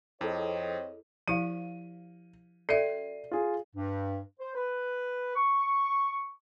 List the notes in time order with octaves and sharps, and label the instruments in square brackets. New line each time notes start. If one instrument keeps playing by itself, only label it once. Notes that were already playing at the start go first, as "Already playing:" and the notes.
[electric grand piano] F2 [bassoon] C4 [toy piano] E4 G#4 A4 [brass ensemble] C#5 D#5
[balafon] F3 E4 [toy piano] G4 C5 F5 [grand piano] D#7
[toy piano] C#4 F#4 D5 [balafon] A4 E5 [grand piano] C7 D#7
[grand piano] F4 G#4
[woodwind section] G2
C5
B4
C#6